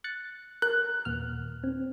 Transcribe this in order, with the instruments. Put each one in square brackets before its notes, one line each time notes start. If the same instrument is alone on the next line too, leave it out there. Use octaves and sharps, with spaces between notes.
[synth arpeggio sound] F#6 A6 C#7
[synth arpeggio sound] A#4 [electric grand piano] F#6
[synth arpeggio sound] D#2 A#2 F6
C4